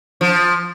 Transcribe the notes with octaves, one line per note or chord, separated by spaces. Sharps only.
F3